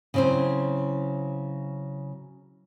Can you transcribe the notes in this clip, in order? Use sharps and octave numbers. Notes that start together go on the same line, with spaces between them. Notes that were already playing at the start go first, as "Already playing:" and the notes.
C#3 F#3 C4 E4 C5